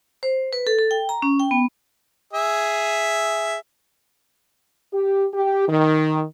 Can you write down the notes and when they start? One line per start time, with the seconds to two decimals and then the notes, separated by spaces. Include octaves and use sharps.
0.23 C5
0.53 B4
0.67 A4
0.79 A4
0.91 G5
1.09 A#5
1.22 C#4
1.40 G5
1.51 B3
2.33 G#4 E5
4.93 G4
5.34 G4
5.69 D#3